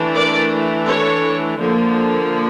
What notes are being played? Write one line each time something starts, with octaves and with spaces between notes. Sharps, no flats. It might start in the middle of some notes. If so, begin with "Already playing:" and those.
Already playing: E3 A3 D4
A#4 D5
A4 C#5
D3 F3 A#3